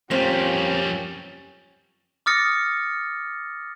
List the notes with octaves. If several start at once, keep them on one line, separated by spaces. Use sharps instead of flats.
F2 G3 A#3 C4 C#4 F4 G4
D6 D#6 F6 A6 A#6 C#7